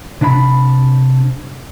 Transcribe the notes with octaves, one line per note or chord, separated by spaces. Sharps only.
C3 D4 E5 B5